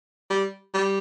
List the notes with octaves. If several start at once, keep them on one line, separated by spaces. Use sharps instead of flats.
G3
G3